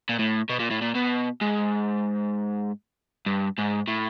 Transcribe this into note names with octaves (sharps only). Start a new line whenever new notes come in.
A#2
A2
B2
A#2
A2
A#2
B2
G#2
G2
G#2
A2